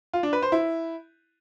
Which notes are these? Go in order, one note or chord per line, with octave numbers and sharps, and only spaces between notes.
F4
D4
B4
C5
E4